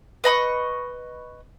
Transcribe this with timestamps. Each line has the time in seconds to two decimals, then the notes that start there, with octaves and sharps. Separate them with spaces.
0.24 B4 D#5 B5 C#6